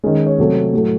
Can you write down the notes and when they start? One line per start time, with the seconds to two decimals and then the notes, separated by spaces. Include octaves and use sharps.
0.03 D#3 G#3 C#4
0.27 C#5
0.38 C3 F#3 A3
0.73 A2 F#3 A3